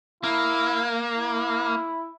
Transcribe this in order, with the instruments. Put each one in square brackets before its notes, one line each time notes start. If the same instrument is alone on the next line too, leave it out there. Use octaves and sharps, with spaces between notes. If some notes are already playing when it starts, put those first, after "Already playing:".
[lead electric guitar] A#3 [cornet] E4
[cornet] E4